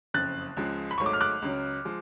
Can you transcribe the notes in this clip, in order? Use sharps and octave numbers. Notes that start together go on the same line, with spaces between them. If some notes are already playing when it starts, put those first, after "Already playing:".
F#1 F2 C#3 F#6 A6
C#2 C#3 F3 G#3
B5
G#1 G#2 F#3 A3 C#6
D6
F6
D6 F#6
C#2 C#3 F#3
F3 G#3